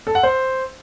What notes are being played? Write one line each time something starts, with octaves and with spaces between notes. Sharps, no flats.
A4
F#5
C5